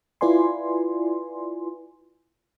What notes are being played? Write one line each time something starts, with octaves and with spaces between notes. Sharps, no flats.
E4 F4 B4 D5 G#5 C6